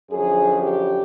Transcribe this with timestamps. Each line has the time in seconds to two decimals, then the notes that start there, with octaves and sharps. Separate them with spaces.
0.10 F#2 D3 F3 G#4
0.63 G4